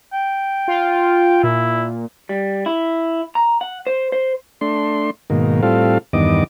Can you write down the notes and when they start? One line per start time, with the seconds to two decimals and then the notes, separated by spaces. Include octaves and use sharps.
0.13 G5
0.68 F4
1.43 A#2 E4
2.29 G3
2.66 E4
3.35 A#5
3.61 F#5
3.87 C5
4.12 C5
4.61 A3 D4 C6
5.30 G#2 B2 D#3 A#3
5.62 A2 G3 C4 F4 A4 F5
6.13 E2 G2 D#3 B3 D#5 D6